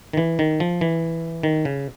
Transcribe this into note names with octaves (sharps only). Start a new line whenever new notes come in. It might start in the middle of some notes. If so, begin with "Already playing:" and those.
D#3
E3
D#3
F3
E3
D#3
C#3